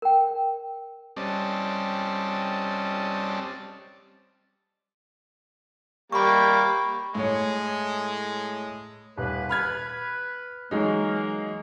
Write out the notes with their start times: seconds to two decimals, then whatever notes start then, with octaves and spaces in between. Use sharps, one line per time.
0.02 A#4 G5
1.17 G3 C4 C#4 D5 D#5 A5
6.12 G3 A#3 B5 C#6
7.15 A2 G#3 C#5
9.17 D#1 B4
9.49 B5 F6 G#6
10.71 E3 F#3 G#3 A#3 D#4